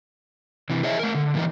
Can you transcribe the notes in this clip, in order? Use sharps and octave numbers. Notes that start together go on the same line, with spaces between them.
C3 E3
G#4 C#5 D#5 E5
A3 A#4
D3
A#2 D#3 E3 G3 D#4